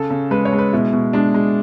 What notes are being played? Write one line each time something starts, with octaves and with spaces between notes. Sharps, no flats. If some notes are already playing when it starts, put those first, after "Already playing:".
Already playing: C#3 A4
C#3
G#3 B4
C#5
G#3
B4
B2 E4
B2
G#3 D4
G#3